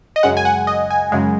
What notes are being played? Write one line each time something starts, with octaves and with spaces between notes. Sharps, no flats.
D#5
F#2 C#3 G#3 F#5
G#5
F#5
D#5
G#5
F#2 C#3 G#3